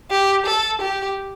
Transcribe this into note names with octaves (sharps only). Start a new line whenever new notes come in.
G4
A4
G4